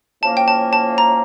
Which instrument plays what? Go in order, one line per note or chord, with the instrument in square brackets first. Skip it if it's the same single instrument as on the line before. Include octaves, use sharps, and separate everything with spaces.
[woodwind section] A2 F3 A#3 C#4 [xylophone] A5
[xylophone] G5
A5
A5
A#5